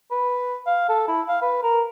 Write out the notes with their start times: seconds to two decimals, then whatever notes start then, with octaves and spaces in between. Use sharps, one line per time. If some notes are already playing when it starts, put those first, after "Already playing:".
0.11 B4
0.67 F5
0.89 A4
1.08 E4
1.29 F5
1.42 B4
1.63 A#4